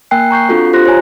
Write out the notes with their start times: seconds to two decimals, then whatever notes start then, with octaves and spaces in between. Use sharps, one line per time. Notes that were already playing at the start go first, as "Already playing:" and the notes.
0.11 A#3 A#4 G5 G#5 F#6 C7
0.31 A#5 C#6 G6 C7
0.49 C4 D4 F4 F#4 A4
0.73 F4 G4 C5 C6 F#6 A#6
0.86 C5 C#5 G#5 A#5